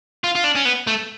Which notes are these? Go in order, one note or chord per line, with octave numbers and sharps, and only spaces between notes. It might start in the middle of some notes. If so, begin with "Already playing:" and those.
F4
F4
D4
C#4
B3
A3